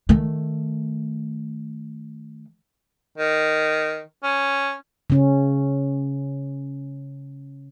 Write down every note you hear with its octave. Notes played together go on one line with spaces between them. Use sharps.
D#3 A3
D#3
C#4
C#3 C#4